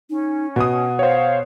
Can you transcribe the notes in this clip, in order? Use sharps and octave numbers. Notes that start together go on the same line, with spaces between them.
C#4 D#4
B2 F#5 D#6
C5 C#5 F5